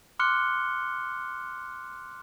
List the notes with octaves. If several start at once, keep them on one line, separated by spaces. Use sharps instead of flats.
C6 D6 F6 F#6 C#7 G7